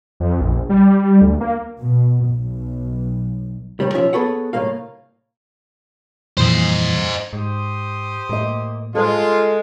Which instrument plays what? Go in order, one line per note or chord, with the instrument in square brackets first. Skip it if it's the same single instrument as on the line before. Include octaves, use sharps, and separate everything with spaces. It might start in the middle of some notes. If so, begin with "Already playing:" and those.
[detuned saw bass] F2
A#1
G3
D2
A#3
[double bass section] B2
B1
[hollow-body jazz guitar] A2 C3 G3
B1 F3 C#4 F4 E5
B3 G#4 A4 B4 C#5 F#5
C2 A2 C#3 G#3 A#3 F5
[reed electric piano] F2 A#2 E3 [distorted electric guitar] C5 D#5
[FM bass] G#2 [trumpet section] G4 C5 D#6
[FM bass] A2 [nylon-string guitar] A#3 D#5
[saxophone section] G#3 [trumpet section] F4 [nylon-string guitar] A4 C5